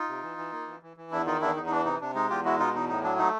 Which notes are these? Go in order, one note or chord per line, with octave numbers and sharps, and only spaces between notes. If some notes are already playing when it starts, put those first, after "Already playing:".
Already playing: D#4 F4
C3
E3
E3
A#3
E3
E3
E3
E2 D4 E4
D#3 D#4 F4
E2 D4 E4
E2 D#4
D#4
E3 D4
C3 D#4
C3 D4
G#3 D#4
E2 F4 G4
G#3 E4 F#4
B2 D#4 F4
E2 D#4
A2 D#4
F#3 D4
A3 D#4